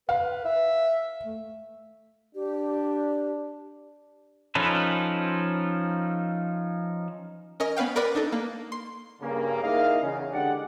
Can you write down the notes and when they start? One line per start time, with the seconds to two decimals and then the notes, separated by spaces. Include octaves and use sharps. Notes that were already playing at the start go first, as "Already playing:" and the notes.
0.09 B4 F5
0.45 E5
1.24 A3
2.35 D4 G4
4.55 F3 C#4 D#4 A4 B4
7.60 C#4 A#4 D#5
7.76 B3 C#4 B4 F5 G5
7.96 A#4 B4 D5 F#5
8.15 D4 D#4 A4
8.32 A#3
8.72 C6
9.21 G2 C#3 A#3
9.63 D#4 E4 G#4 A#4 D#5 F5
10.02 E2 C#3
10.33 D3 G#3 D4 G4 D5 F#5